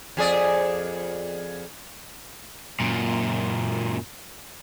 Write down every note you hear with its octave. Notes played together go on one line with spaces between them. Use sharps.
F2 G#4 D5
F#2 A#2